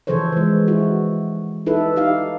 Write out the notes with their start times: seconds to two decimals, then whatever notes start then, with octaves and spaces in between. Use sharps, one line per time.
0.07 C#3 E3 F3 A4 C5 C#5
0.32 E3 G#3
0.68 E4 F#4
1.66 D#4 E4 A4 B4
1.96 D#4 G4 F5